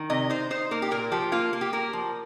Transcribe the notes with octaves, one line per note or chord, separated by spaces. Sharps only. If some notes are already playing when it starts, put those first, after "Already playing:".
Already playing: D#3
C3 D#5
D#4 C5
D#4 C5
A#3 A#4
G4
A#2 A#4
F3 G4
A#3 F4
A#3
G4
A#3 A#4
F3